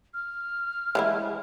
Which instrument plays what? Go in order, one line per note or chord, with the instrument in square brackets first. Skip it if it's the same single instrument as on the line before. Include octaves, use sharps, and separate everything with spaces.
[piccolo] F6
[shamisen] E3 G#3 E4